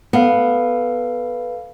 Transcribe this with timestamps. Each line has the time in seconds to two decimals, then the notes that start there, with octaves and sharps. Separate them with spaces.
0.13 B3 A4 F5